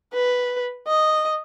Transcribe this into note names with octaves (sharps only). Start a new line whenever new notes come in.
B4
D#5